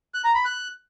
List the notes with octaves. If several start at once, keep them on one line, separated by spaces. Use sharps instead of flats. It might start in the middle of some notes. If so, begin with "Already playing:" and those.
F#6
A#5
B5
F#6